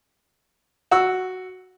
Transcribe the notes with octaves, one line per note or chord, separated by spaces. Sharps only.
F#4 E6